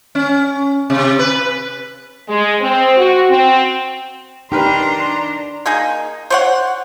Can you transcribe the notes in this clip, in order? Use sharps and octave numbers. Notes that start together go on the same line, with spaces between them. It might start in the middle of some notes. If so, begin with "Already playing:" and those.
C#4
C3
B4
G#3
C4
F#4
C4
D4 D#4 G4 A#4 B4 A#5 C6
A#3 D#4 G#4
C5 C#5 F#5